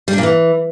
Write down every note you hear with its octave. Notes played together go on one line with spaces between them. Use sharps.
G3
D4
A#2
E3